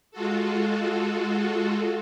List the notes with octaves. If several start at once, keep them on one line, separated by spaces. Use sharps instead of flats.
G#3 F4 F#4 A4